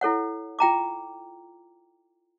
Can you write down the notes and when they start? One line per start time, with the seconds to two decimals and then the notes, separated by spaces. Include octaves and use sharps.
0.01 E4 A4 C#5 F#5
0.59 F4 G5 A#5 D6